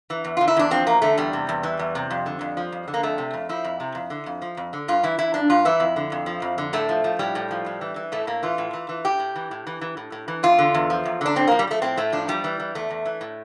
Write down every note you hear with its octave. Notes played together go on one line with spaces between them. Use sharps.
E3
E2
D3 F4
E4
E2 D4
F3 C4
E2 A#3
D3 A3
E2 G3
C3
E2
E3
E2
C3
F2
D3
F2
F3
F2
D3
A#3
F2 A3
C3
F2
F3 E4
F2
C3
F2
D3
F2
F3
F2
D3
G2 F4
E3 E4
E3 E4
G2 D4
G2 F4
E3 E4
F2
D3
F2
F3
F2
D3
A2 A3
F3
F3
A2 G3
A2
F3
A2
E3
E3
A2 A3
A2 A#3
E3 F4
A2
E3
E3
A2 G4
A2
E3
A2
E3
E3
A2
A2
E3
E2 F4
D3
E2
F3
E2
D3 D4
A2 C4
F3 A#3
G3
F3 A3
A2 C4
A2 A3
F3 D4
E2 G3
E3
E3
E2 A3
E2
E3
A2